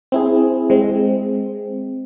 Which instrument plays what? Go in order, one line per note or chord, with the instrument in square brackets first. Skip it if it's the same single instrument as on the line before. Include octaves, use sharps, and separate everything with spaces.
[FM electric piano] C4 E4 G#4
G#3 C4